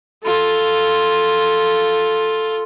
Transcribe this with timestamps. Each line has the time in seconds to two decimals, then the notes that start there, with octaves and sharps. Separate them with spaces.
0.23 F4 A4